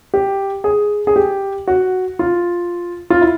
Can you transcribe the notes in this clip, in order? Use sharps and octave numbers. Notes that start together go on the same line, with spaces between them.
G4
G#4
G#4
G4
F#4
F4
F4
E4